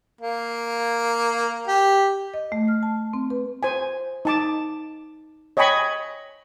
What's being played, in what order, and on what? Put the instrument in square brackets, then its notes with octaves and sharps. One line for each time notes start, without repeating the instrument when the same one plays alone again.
[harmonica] A#3
G4
[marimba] D#5
A3
F6
A5
C4
B4
[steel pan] C5 G#5
D#4 A5 D6
C#5 D#5 G5 G#5 B5 C#6